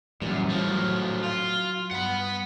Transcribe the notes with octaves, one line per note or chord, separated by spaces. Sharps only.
F#2 A#2 E3 G3 C#4
A2 F3
F#3
F4
G2 F#5 B5